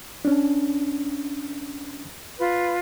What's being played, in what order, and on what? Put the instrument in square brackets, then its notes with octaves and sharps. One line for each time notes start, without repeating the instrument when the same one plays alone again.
[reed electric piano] C#4 D4
[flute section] F4 B4